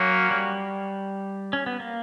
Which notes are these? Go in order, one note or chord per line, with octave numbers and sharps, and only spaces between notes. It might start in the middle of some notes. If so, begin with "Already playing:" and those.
Already playing: F#3 A#3 C#4 F#4
G3
C#4
B3
A#3